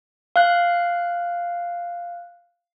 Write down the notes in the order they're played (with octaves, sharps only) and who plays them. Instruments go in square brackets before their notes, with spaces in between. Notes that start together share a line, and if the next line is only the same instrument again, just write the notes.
[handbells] F5 F#6